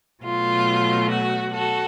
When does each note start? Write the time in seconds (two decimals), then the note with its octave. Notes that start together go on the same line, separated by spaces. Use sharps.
0.24 B2 F#3 A3 F4
1.10 F#4
1.53 F#4 A4